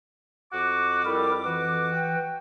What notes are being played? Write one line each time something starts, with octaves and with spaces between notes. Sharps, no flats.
F2 F#4 D6
G3 E4 A4 A#4
E3 F#4
G5